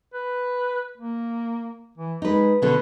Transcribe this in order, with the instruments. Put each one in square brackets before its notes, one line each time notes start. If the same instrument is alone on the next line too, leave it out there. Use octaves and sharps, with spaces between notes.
[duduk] B4
A#3
E3
[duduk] G#3 [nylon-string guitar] D#4 B4
[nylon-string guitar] B2 D3 B3 [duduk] B4